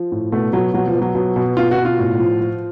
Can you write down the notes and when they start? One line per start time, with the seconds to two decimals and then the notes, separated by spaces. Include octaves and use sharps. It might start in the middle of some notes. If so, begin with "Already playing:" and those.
Already playing: F3
0.12 A2
0.32 B2 A3
0.53 B2 F#3
0.73 B2 F#3
0.87 F3
0.95 B2
1.02 F#3
1.15 B2
1.36 B2
1.57 B2 F4
1.71 F#4
1.77 B2
1.85 F4
1.99 A2
2.19 F3
2.41 F3